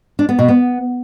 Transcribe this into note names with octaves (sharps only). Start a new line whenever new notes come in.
D4
B3
B2
B3